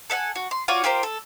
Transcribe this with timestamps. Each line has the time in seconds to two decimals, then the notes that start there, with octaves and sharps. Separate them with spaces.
0.10 A4 E5 F#5 G#5
0.35 F#4
0.51 C6
0.68 F4 F#4 C#5 D5
0.84 F4 G4 A#4 C5
1.03 A4